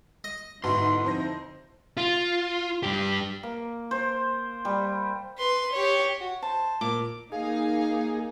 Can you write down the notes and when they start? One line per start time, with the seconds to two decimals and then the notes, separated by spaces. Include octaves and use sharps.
0.24 D#5
0.64 G#2 B2 D3 D#4 E4 C6
1.04 F2 C5 A#6
1.97 F4
2.83 G2 G4
3.43 A#3
3.91 C5
4.65 G3
5.38 B4 C6
5.73 G4 C#5
6.21 F#4
6.42 C5 A5
6.81 A#2 D6
7.32 A#3 D#4 G#4 F5